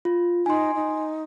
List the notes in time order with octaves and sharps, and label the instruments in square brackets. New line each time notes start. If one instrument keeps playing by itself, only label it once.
[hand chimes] F4
[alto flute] D#4 [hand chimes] G#5 C6
[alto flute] D#4